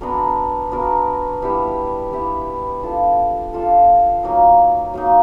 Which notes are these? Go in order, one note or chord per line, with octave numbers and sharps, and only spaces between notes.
B3 D4 F#4 A#4
B3 D4 F#4 A#4
G3 B3 E4 G4
G3 B3 E4 G4
D4 F4 A4
D4 F4 A4
F#3 A#3 D#4
F#3 A#3 D#4